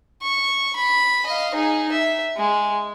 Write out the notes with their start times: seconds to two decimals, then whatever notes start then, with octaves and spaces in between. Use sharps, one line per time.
0.22 C#6
0.75 B5
1.26 D#5 F5
1.54 D#4 G#4
1.91 E5
2.37 G#3